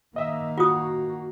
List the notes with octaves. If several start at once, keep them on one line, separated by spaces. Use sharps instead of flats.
D#3 A#3 D#5 E5
F4 F#4 D#6